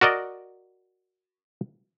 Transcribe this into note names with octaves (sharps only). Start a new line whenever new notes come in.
F#4 A#4 D5 D#5